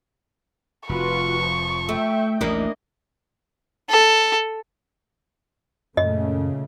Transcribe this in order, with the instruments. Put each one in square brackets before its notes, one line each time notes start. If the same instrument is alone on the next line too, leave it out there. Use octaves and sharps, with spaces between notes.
[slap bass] F1 [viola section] F4 F#4 B4 [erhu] C#6
[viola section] F3
[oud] A3 [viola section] E5 G5
[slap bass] A1 D#2 A2 [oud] A#3 D4 E4 [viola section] D#5
[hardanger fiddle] A4
[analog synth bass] F#2 [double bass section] A#2 C#3 A3 [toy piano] D#5